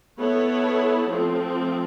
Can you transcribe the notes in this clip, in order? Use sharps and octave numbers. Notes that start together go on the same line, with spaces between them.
B3 E4 A4 C#5
F3 A3 C4